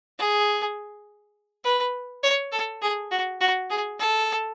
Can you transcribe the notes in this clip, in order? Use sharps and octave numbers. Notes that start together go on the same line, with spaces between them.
G#4
B4
C#5
A4
G#4
F#4
F#4
G#4
A4